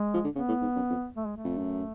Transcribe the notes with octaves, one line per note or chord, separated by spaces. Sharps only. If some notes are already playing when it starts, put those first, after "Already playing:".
Already playing: G#3
F3
D3
C#3 B3
A2
G#2
F#2
F2
A3
G#3
A3
F2
F#2